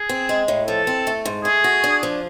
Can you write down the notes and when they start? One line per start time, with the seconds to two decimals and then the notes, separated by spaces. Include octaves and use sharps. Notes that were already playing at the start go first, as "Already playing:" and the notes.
Already playing: G#4
0.09 C4
0.29 G#3
0.48 A2
0.67 F3 A4
0.87 C4
1.07 A3
1.25 G#2
1.45 A3 G#4
1.64 F#4
1.84 D4
2.03 F3